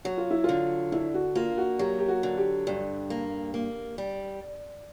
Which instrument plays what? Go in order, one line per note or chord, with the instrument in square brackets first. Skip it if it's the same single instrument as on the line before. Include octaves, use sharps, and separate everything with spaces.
[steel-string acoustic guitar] F#3 [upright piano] F#4
[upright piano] F4
E4
[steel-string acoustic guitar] D3 [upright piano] F4
[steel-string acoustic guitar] G2 [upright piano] E4
[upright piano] F#4
[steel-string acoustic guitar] A#3 [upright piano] F4
[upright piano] F#4
[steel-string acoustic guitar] F#3 [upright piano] G4
[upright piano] G4
F#4
[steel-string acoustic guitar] D3
[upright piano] G4
[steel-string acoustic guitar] G2
A#3
A#3
G3